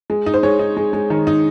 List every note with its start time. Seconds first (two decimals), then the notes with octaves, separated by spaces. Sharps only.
0.10 G#3
0.26 D#4
0.34 C5
0.43 G#3 C#5
0.59 D#4
0.77 G#3
0.93 G#3
1.10 D#3
1.27 D#4